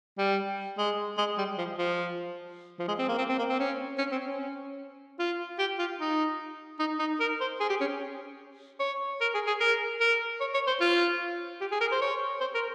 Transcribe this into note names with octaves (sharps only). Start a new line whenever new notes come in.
G3
G#3
G#3
G3
F3
F3
F3
G#3
C4
A#3
C4
C4
A#3
C4
C#4
C#4
C4
C#4
F4
G4
F4
D#4
D#4
D#4
A#4
C5
G#4
G4
C#4
C#5
A#4
G#4
G#4
A#4
A#4
C#5
C#5
C5
F4
G4
G#4
A#4
C5
C#5
C5
A#4